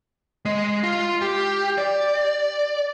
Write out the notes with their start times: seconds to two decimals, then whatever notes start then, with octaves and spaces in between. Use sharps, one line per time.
0.46 G#3
0.83 F4
1.22 G4
1.78 D5